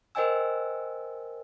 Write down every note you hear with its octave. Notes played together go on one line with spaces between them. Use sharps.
A#4 C5 D#5 G5 G#5 E6